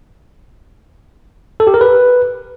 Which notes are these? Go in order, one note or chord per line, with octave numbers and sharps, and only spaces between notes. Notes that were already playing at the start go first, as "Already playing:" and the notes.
A4
G4
A#4
B4